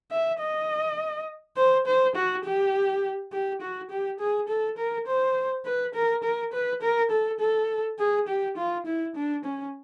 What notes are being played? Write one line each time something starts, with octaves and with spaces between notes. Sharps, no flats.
E5
D#5
C5
C5
F#4
G4
G4
F#4
G4
G#4
A4
A#4
C5
B4
A#4
A#4
B4
A#4
A4
A4
G#4
G4
F4
E4
D4
C#4